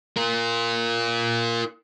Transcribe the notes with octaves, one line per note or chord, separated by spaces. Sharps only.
F4 A#4